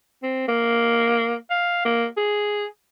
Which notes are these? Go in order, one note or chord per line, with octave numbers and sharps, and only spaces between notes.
C4
A#3
F5
A#3
G#4